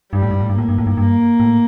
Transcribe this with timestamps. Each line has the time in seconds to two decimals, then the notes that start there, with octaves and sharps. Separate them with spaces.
0.13 G2 G3
0.22 A2
0.31 G2
0.40 A2
0.49 G2
0.55 A2 A#3
0.69 G2
0.78 A2
0.87 G2
0.97 G2 A#3
1.40 A2